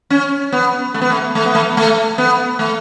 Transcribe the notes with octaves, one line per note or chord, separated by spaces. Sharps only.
C#4
B3
A3
B3
A3
A3
B3
A3
A3
B3
A3